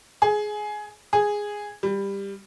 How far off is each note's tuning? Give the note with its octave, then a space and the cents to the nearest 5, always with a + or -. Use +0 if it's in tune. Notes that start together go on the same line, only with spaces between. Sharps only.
G#4 +15
G#4 -5
G3 +15